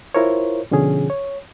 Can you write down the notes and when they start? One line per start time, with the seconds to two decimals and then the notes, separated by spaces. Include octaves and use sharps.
0.15 E4 F4 A#4 C5 C#5
0.71 B2 D3 F3 C#4 G#4
1.10 C#5